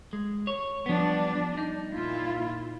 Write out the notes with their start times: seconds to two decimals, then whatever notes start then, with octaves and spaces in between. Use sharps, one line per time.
0.13 G#3
0.47 C#5
0.86 F3 G3 B3 D4
1.57 D#4
1.93 A#2 E4 F4